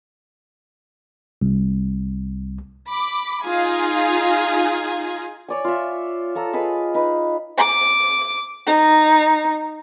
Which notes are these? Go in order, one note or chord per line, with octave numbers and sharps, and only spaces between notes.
C2
B5 D6
D#4 F4 G#4 F5 G#5
C#5 D5 G#5
F4 E5
F4 A4 A#5 E6
G#4 B4 D#5 B5
D#4 B4
D6
D#4